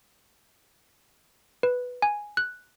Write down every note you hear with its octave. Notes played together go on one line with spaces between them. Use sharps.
B4
G#5
F#6